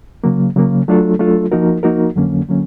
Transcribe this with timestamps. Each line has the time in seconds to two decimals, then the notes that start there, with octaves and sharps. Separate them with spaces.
0.24 C#3 F#3 A#3
0.56 C#3 F#3 A#3
0.88 F#3 A3 D4 F4 A4
1.19 F#3 A3 D4 F4 A4
1.52 F3 A#3 D#4 F#4 A#4
1.83 F3 A#3 D#4 F#4 A#4
2.16 F2 D3 F#3 A#3 C#4
2.48 D3 F#3 A#3 C#4